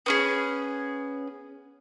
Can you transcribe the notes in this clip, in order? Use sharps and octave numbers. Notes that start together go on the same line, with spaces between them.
B3 C#4 G#4